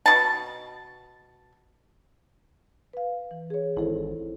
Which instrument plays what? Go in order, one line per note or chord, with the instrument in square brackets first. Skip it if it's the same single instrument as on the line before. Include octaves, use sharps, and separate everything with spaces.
[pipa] B2 A5
[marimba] B4 F5
E3
G#4 C#5
[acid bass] G#1 [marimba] E4 A4 C5